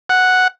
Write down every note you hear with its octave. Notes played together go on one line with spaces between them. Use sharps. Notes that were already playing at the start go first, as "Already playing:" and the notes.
F#5